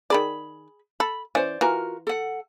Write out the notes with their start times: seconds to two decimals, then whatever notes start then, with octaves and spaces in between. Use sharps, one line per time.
0.10 D#3 G#4 D5 B5
1.00 A4 B5
1.35 E3 C#4 C5 D5
1.61 E3 F4 F#4 A#4
2.07 A4 F#5